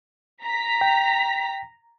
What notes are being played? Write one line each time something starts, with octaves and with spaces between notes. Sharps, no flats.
A#5 B6
G5